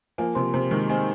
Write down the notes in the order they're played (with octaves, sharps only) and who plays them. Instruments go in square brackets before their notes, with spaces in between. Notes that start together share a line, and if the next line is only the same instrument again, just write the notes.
[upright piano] F3 A#3 [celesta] G#5
[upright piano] C3 F3 [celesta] C6
[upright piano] C3 [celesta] C5
[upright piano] D#3 G#3 [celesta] D#4
[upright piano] G#3 C4 [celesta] G#5